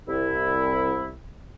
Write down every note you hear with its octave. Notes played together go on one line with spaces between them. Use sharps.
C2 E4